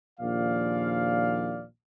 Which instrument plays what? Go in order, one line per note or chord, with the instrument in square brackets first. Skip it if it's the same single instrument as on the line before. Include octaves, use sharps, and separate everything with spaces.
[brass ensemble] A#1 D#2 A#2 F3 D5 F5